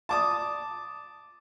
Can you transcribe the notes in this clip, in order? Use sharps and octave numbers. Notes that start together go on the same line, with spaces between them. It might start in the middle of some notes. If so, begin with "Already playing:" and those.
A5 D6 D#6